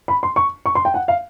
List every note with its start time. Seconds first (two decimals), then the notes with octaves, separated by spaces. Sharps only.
0.08 B5
0.23 C6
0.36 C#6
0.66 C#6
0.75 C6
0.85 G5
0.94 F#5
1.08 F5